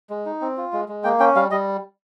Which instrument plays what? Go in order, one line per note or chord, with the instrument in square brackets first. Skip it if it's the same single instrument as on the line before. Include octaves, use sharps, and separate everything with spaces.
[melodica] G#3
D#4
C4
F4
G#3
G#3
A#3 G5
C#4 G5
G3 F5
G3 D#5